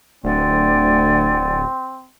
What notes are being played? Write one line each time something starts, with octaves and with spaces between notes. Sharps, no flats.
D1 D2 C4 D5 F#5 G#5